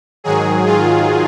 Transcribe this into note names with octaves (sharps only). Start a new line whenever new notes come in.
G#2 D#3 F#3 G#4
F4